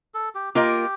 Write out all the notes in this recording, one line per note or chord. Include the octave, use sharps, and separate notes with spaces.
A4
G4
A#3 F4 G4 A#4 D#5